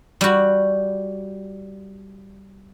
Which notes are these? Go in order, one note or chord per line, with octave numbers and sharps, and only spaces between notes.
G3 F#4